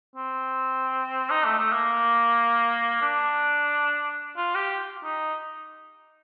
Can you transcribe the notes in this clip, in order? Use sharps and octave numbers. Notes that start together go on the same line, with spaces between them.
C4
D#4
A3
A3
A#3
D4
F4
G4
D#4